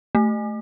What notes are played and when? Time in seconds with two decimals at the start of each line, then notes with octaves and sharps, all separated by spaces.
0.15 A3